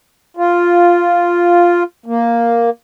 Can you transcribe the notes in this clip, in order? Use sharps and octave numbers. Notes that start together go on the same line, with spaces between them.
F4
A#3